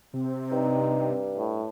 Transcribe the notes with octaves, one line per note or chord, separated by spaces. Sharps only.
C3 C4
G2 D#4
A2